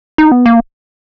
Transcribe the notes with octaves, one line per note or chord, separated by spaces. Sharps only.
D#4
B3
A#3